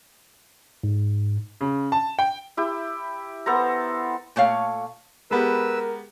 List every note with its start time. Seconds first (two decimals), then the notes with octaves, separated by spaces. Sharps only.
0.84 G#2
1.61 C#3
1.92 A5
2.19 G5
2.57 E4 G4
3.46 B3 A4 C5 A#5
4.36 A#2 A3 C#5 F5
5.31 G#3 B3 G4 A#4 B4 E6